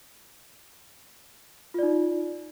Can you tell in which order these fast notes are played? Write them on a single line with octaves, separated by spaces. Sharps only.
F4 D5 D#4